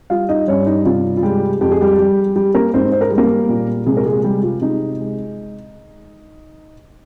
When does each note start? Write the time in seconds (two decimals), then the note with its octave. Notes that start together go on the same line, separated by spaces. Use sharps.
0.10 G3 F4 F5
0.29 D#4 D#5
0.48 G2 C#4 C#5
0.66 D#4
0.85 C3 F4
1.17 F4
1.23 G3 G#3 G4
1.61 F2 G4
1.71 G#4
1.81 G3 G4
1.98 G3
2.36 G3 G4
2.55 A#3 A#4
2.73 G#2 C4 C5
2.92 C5
3.01 A#4
3.09 G3 G#4
3.18 A#3 A#4
3.49 A#2
3.86 C3 G#3 G#4
3.97 A#4
4.05 G#3 G#4
4.24 G3 G#3 G4
4.43 F4
4.61 C3 D#4
4.99 G#3